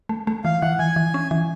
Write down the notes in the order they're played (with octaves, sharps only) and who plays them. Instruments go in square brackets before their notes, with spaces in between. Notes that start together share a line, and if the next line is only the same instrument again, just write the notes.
[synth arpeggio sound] A3
A3
[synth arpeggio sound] E3 [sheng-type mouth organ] F5
[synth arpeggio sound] E3 [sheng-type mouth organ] F#5
[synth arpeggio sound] E3 [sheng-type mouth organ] G#5
[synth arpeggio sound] E3
C#4
E3